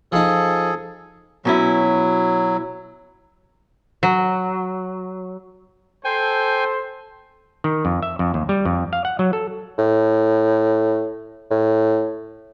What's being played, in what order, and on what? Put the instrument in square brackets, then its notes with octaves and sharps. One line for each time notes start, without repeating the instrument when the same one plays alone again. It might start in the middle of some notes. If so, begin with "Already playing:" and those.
[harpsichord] F3 D#4 [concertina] G#4 A4
[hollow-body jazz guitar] B2 C#4 E4 [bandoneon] F#3
[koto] F#3
[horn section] A4 C5 [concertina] G5 G#5
[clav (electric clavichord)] D#3
F2
E5
F2
D#2
G3
F2
F5
F#5
F#3
A4
[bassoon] A2
A2